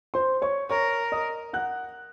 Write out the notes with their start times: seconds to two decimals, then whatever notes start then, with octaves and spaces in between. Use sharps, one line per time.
0.14 C5 C6
0.42 C#5 C#6
0.70 A#4 C#5 C#6
1.12 D#5 D#6
1.53 F#5 F#6